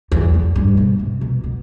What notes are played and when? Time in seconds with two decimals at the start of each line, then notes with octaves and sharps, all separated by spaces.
0.12 E2
0.34 F2
0.55 G2
0.77 B2
0.99 C3
1.21 B2
1.43 B2